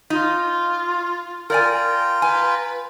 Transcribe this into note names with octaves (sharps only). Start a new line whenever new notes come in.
D#4 F4
F4 A#4 D5 G5 G#5 A#5
B4 G#5